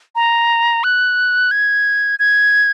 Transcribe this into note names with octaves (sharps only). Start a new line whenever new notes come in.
A#5
F#6
G#6
G#6